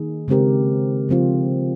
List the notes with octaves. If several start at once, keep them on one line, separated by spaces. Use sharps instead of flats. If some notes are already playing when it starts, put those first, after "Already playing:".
Already playing: D#3 A#3 D#4 G#4
C#3 G#3 C4 G4 A#4
C#3 F3 C4 F4